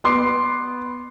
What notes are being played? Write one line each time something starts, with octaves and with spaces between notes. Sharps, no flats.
B3 C6 D6 C7